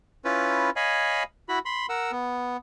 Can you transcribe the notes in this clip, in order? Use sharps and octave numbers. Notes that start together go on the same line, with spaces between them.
C#4 E4 F4 B4
C#5 D#5 F5 G#5 B5
E4 F#4 B5
B5 C6
A#4 F#5 E6
B3